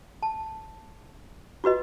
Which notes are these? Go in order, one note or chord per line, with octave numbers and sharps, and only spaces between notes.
A5
F4 F#4 B4 D#5